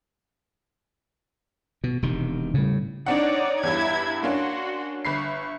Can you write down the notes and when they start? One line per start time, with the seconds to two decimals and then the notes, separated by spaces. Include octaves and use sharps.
1.84 B2
2.02 E1 C3 D#3
2.54 A2 C#3 G3
3.06 C4 D4 D#4 C#5 D5 F#5
3.63 E2 G2 E4 G#6
4.23 A#3 C#4 D4 F#4 C6
5.05 G1 B5 C#6 C7